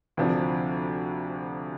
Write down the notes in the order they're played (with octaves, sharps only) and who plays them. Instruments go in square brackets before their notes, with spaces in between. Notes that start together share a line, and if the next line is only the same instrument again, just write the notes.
[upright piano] D2 C3 F3 D4